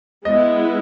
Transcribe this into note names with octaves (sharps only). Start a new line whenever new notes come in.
G#3 B3 E4 D#5